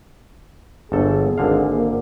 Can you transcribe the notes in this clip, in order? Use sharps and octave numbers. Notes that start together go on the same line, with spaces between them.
G1 G#4 A4
G#1 D3 F5
A#3